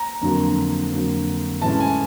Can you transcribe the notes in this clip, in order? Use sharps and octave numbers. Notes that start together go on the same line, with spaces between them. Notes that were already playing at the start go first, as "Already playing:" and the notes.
Already playing: A#5
F2 D3 F#3 A#3
F2 D3 F#3 A#3
A2 E3 G#3 C#4 A5
G#5